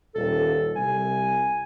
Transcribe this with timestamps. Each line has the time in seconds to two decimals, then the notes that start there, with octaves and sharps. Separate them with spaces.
0.15 D#1 A4
0.76 C2 G#5